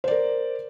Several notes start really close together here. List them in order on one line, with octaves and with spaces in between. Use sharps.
C5 D5 A#4